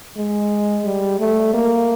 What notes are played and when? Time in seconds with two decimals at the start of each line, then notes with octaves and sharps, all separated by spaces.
0.17 G#3
0.85 G3
1.20 A3
1.54 A#3